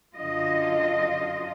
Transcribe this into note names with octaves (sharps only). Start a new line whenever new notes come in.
F#2 D3 F4 D#5